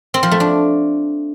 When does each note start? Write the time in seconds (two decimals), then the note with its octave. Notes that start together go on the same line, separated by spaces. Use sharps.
0.14 C4
0.23 F3
0.31 A3
0.40 D4